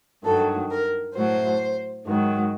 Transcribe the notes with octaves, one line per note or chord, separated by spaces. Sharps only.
G2 D#3 F#3 A4
A#4
A2 F#3 C5
G#2 D#3 F#3